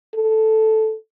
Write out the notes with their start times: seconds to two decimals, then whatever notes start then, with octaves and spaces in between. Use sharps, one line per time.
0.14 A4